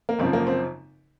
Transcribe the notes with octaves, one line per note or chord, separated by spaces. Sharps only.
A#3
G#1 F#2 C#3 F3 C4
A#3
C4